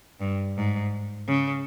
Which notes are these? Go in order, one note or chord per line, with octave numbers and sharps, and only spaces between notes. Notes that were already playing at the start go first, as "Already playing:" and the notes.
G2
G#2
C#3